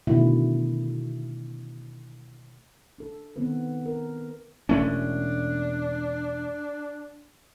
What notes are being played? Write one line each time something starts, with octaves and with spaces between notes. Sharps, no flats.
B2 D3 D#3 A3 E4
D4 A4
D#3 B3 C4 A4 B4
A#4
E1 A3 C#4 D4